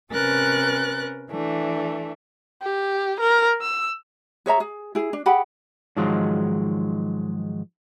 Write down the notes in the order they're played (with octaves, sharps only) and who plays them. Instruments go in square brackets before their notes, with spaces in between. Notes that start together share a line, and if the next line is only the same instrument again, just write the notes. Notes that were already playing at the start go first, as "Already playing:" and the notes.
[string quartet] C3 C#4 A#4 B4 F#6 A6
E3 A3 D4
[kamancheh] G4
A#4
E6
[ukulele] G#4 C#5 E5 A#5
G#4
E4 G#4
D4
G4 G#4 F#5 B5
[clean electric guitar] G#2 D#3 F3 F#3 G#3